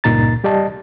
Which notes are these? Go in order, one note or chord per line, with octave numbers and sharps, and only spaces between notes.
C#2 G2 A#2 D#4 A#5 A6
G3 G4 D5 D#5 A5